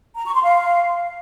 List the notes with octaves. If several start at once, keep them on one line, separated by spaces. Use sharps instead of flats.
A#5
C#6
C6
F5